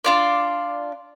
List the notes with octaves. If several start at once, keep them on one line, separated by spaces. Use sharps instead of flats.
D4 F4 D5